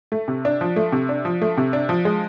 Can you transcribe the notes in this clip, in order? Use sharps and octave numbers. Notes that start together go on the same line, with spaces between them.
A3
C3
D4
F3
A3
C3
D4
F3
A3
C3
D4
F3
G#3